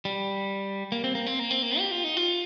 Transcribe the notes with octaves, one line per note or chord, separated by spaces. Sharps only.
G3
A#3
C4
A#3
C4
A#3
C4
A#3
G4
F4
D#4
F4